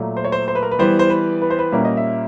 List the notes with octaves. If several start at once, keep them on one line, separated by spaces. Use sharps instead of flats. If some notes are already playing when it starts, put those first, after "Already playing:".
Already playing: A#2 F#3 A3
C5
C#5
C5
C5
B4
A#4
B4
E3 G3 B3 C5
C5
B4
B4
C5
B4
A#2 G3 A#3 C#4 E5
D#5
E5